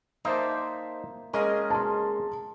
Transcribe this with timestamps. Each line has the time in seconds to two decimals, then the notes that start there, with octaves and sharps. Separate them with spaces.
0.25 A#3 D#4 C5 D5 E5 A5
1.33 G#3 A#3 C#4 G#4 A#4 D#5
1.70 A5 C6